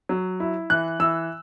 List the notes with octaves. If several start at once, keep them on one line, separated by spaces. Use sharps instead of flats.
F#3
E4
E3 F#6
E3 E6